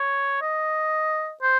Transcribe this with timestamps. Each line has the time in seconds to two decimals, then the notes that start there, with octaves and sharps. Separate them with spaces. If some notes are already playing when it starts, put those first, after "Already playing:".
Already playing: C#5
0.42 D#5
1.42 C5